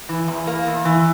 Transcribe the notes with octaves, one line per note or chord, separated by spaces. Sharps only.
E3
E2
A#3
E2
E3